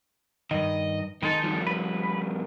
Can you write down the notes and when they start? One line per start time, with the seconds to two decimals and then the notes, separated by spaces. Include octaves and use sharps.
0.51 G2 D#3 D#5
1.22 D#3 G#3 D#4 A4
1.43 G2 F3
1.67 B4